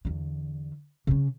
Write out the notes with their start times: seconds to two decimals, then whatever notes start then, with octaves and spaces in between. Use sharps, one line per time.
0.05 E2 D3
1.07 C#3 C#4